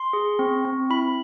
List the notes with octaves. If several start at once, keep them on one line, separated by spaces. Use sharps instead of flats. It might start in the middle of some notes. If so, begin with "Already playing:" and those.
Already playing: C6
G#4
C4
C4
E4 B5